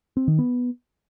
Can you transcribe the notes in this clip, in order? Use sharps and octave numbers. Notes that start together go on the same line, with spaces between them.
C4
D#3
B3